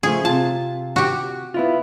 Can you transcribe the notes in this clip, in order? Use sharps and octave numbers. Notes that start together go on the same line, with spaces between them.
C#3 F3 A3 G#4
C3 F4 A5
F#4 G4
B3 E4 F4